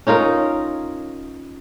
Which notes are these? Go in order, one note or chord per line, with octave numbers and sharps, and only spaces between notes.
C#4 D#4 F4 A#4